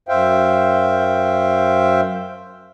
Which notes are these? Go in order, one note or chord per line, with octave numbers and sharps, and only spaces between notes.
F#2 C5 E5 F5 G5